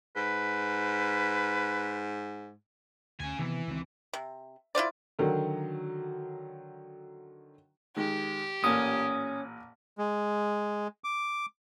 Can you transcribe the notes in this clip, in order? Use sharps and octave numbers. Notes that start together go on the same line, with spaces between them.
G#2 B4
D2 C#3 G#5
C3 D#3 E3 B3
C#2 D#3 C4
C3
E4 F4 C5 D5
D3 D#3 F#3
D#3 G#3 G4
A1 A#2 A#3 C#4 D#6
G#3
D6